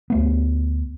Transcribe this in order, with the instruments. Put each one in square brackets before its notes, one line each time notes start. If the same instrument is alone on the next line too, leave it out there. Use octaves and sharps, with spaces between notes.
[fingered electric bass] D2 A3 B3